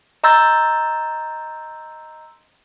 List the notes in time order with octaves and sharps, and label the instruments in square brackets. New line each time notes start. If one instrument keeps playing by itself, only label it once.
[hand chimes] D#5 A#5 C6 E6 G6 A6